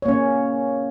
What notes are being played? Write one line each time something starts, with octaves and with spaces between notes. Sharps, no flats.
A#3 C#4 C#5